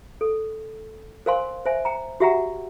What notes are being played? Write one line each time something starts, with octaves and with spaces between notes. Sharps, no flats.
A4
A#4 C5 F5 G#5 C6
C5 E5 G#5
G5 A#5
F#4 G4 E5 F#5 G5 A#5